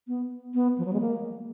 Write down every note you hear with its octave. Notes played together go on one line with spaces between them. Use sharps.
B3
B3
F3
F#3
G#3
A#3